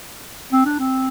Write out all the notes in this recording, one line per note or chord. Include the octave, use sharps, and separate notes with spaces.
C4
D4
C4